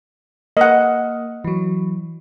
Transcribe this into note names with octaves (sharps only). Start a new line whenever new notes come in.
A#3 D#5 F#5
E3 F#3